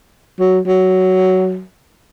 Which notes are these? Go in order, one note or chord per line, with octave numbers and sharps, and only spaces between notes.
F#3
F#3